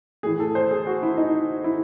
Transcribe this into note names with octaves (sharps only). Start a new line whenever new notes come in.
A2 E3 G#4
A4
C5
G#4
F#4
E4
D#4
E4